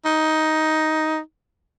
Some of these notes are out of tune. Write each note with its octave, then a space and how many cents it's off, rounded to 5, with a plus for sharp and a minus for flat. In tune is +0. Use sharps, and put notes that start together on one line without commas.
D#4 +10